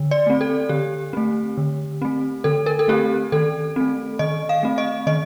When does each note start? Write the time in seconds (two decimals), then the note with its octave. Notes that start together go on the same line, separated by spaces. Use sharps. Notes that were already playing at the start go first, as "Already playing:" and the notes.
Already playing: D3
0.11 D5
0.26 A3 C4
0.41 A4
0.69 D3 G4
1.13 A3 C4
1.57 D3
2.02 A3 C4
2.44 D3 A4
2.66 A#4
2.79 A4
2.88 A3 C4 G4
3.32 D#3 A4
3.76 A3 C4
4.19 D#3 D#5
4.49 F5
4.63 A3 C4
4.78 D#5
5.07 D#3 D#5